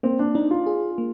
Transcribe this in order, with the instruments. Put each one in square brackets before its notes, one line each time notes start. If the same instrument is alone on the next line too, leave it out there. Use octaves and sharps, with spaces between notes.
[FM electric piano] A#3 [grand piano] C4
[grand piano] D4
[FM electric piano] D4 [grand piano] D#4
[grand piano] F4
[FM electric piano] G#4
A#3